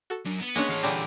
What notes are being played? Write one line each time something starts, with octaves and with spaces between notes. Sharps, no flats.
F#4 A4
F#2 D4
B3
G#3 A#3 C#4 D4 C#5 F#5
E3 A4 F5
A#2 D3 G3